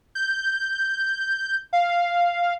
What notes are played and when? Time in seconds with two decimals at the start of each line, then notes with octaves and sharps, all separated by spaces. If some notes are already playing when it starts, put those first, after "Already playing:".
0.15 G6
1.73 F5